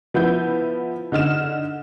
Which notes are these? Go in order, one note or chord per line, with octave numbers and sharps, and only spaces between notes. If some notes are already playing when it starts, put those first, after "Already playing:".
F3 B3 E4 G6
D3 D#4 F6 E7